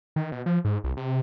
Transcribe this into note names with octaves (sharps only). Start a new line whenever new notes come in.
D#3
B2
F3
G#2
C2
C3